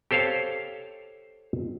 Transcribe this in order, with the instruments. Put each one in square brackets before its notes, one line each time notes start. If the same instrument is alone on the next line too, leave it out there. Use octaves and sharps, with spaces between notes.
[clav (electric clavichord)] G4 A4 C5 C#5 F5